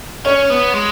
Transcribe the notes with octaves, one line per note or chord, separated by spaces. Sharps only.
C#4 C#5
B3
G#3